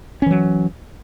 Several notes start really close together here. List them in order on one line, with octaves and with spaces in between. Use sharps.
C#4 E3 F#3